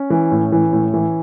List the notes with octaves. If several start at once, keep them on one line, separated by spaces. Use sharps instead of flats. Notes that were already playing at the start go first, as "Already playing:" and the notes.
Already playing: C#4
E3
A2
E3
A2
E3